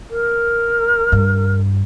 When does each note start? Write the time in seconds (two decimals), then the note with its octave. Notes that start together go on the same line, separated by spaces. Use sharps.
0.10 A#4
1.12 G2